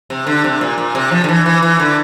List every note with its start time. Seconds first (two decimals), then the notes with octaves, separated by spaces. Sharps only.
0.10 C3
0.27 D3
0.44 C3
0.61 A#2
0.78 A#2
0.95 C3
1.11 F3
1.24 D3
1.29 E3
1.46 E3
1.62 E3
1.80 D3